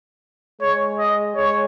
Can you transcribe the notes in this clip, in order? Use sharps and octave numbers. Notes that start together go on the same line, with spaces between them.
G#3 C#5
D#5
G#3 C#5